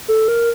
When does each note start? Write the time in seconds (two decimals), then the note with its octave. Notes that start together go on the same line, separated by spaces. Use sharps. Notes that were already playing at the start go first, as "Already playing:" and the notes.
0.08 A4
0.28 A#4